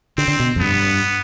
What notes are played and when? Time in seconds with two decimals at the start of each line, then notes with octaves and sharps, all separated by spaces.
0.18 D3 C4
0.28 D3
0.40 B2
0.56 F2
0.60 G2 B3